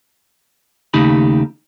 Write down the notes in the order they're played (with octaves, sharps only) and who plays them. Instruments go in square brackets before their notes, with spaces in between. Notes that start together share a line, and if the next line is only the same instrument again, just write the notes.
[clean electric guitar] D#2 C#3 A3 D#4 G4 B5